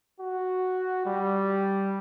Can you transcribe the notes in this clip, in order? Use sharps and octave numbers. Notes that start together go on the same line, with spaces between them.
F#4
G3